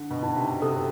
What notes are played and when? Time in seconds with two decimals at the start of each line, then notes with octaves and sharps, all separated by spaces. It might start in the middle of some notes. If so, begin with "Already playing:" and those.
Already playing: D3
0.10 B2
0.23 D#4
0.36 C3
0.62 C3 A4